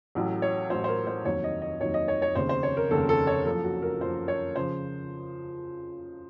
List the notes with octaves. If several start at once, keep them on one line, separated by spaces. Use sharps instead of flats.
A1 A2 F#3
C#5
A1 A2 F#3 C5
C5
A#4
C5
F1 D#2 D#3 F#3 C#5
D#5
D#5
F1 D#2 D#3 F#3 C#5
D#5
C#5
C#5
F1 D#2 C#3 C5
C5
C#5
A#4
F1 D#2 C#3 A4
A4
C#5
F#1 F#2 F3 A4
F#4
A#4
F#1 F#2 F3 C5
C#5
C#3 F3 C5